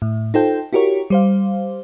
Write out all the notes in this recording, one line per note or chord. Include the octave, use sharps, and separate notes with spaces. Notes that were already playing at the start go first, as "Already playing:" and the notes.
A2
D#4 F4 A4 C5 G5
E4 F#4 G4 A#4 C#5
G3 C5 F5